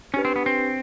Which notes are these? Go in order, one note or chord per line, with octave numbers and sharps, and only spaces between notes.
C#4 D4 G4 B4
C4
B3
C4